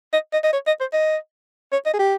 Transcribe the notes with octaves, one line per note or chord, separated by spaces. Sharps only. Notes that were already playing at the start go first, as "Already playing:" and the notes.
D#5
D#5
D#5
C#5
D#5
C5
D#5
C#5
D#5
G#4
G4